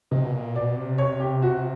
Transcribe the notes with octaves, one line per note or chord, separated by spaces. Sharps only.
C3 D#5
B2
A#2
B2 D5
C3
C#5
G4
F#4